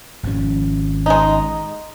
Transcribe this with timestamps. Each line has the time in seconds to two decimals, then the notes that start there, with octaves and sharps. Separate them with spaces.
0.23 G#1 F3 C#4
1.06 G#3 D#4